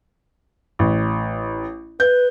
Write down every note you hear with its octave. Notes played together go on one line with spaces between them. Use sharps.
A1
B4 G6